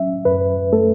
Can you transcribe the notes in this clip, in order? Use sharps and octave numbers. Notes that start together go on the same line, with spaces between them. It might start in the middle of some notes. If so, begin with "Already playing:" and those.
Already playing: F#3 C#4 E5
F#2 B4
A3 A4